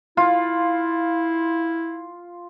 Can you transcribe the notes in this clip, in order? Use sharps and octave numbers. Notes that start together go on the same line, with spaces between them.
E4 F4